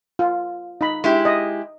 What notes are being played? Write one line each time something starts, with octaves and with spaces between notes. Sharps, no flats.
F4
D#4 B5
G#3 E4 G4
D#5